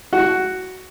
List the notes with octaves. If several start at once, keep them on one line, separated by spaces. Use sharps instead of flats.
F#4 F#5